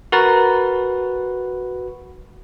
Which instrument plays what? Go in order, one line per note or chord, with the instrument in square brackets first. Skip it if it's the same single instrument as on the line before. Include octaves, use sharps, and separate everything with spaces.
[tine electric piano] F#4 B4 [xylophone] A#4 A#5 A6